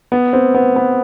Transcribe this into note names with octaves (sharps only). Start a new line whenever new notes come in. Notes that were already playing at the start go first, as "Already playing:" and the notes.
B3
C4
B3
B3